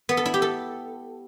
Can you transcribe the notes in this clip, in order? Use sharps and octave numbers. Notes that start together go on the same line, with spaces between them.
B3
A4
E4
G4
A4